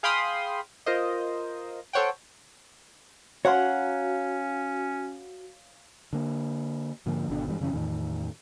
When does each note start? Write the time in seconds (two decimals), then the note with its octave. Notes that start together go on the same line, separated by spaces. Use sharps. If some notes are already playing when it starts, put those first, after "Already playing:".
0.03 G#4 F5 G5 B5 C6 D#6
0.86 F4 A#4 C5 D#5
1.93 A4 C5 C#5 F#5 G5
3.45 C#4 F#4 C#5 F5 F#5 A#5 C6
6.13 D3 A#3
7.06 G#2 D3 F3 A#3
7.29 G#1 B2 D3 D4
7.49 G2 E3 G#3
7.60 F#2 C#3 E3 C#4
7.73 E2 A2 D#3